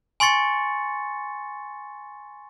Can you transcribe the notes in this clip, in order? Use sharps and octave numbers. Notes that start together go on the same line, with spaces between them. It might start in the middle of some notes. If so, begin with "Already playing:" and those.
G#5 C6 C#6 A6 C#7